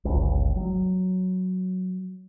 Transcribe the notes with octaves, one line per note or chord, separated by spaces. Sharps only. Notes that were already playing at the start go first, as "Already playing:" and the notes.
G1 C#2
F#3